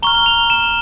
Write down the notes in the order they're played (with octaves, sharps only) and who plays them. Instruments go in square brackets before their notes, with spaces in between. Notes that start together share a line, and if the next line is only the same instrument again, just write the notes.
[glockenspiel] A#5 C#6 F6 G7
F7
E7